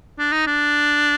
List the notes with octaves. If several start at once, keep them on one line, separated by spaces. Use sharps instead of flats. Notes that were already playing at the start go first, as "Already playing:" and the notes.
D4
D#4
D4